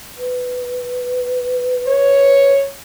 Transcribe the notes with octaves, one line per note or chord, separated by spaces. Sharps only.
B4
C#5